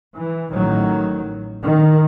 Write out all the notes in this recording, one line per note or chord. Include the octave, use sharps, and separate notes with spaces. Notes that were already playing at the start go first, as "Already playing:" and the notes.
E3
A1 A2 D#3 F#3
D#3